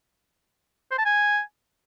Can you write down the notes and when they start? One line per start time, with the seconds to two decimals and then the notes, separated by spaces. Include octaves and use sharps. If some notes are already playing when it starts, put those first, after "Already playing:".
0.91 C5
0.98 A5
1.05 G#5